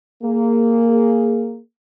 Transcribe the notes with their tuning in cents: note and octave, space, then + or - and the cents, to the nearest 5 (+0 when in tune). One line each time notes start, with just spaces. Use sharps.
A#3 -10 G#4 +0